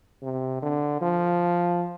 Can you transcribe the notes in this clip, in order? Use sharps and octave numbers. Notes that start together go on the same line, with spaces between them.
C3
D3
F3